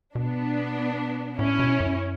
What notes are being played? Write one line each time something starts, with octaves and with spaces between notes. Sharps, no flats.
B2 B3 D4
A2 C#4 E4
B2
F#2